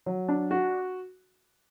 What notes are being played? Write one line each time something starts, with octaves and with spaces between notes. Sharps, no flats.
F#3
D4
F#4